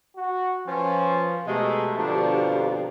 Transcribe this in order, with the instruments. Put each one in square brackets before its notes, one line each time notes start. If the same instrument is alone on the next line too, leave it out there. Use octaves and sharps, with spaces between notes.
[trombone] F#4
[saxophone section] F3 [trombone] C#4 [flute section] B4
[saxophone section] B2 G#3 [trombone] A3 [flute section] G4 A#5
[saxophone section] B2 D3 F3 [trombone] D4
[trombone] F2